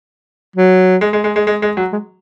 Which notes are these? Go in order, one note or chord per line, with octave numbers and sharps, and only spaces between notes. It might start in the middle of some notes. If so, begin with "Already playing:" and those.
F#3
G#3
G#3
G#3
G#3
G#3
G#3
F#3
G#3